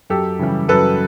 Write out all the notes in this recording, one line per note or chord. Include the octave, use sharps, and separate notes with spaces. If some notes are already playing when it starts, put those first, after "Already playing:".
F#2 G4 A4
C#3 E3 G3
F#2 A4 B4